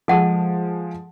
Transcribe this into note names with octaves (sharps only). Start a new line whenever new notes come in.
F3 G#3 A4 F#5 A5